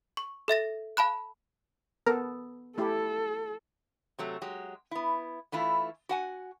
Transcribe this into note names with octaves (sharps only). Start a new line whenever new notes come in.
C#6
A4 E5 A6 A#6
F5 A5 B5 F#6
B3 A4 A#4
A3 E4 G4 A4
C3 F#3 A3
F#3 G#3 G4
B3 E4
E3 A3 E4 F4
F#4 F#5 G#5